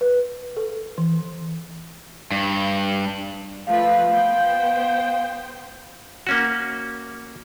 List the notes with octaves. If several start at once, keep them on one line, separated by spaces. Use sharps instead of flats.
B4
A4
E3
G2
F3 A3 B4 F5
B3 C5 G5
A#3 C#4 F#4